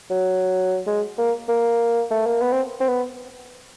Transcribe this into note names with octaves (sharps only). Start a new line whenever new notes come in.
F#3
G#3
A#3
A#3
A3
A#3
B3
C4
C4
B3